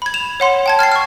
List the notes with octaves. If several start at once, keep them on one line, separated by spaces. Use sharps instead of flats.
B5 G#6
E7 F7
C#5 F#5 C6
G5 A5 G#6
F6 G#6 A6 C7
C#6 F6